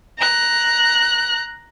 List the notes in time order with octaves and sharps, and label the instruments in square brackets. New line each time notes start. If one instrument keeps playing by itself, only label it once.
[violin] A#5 F#6